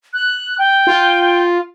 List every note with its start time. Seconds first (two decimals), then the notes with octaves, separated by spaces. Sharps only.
0.13 F#6
0.59 G5
0.87 F4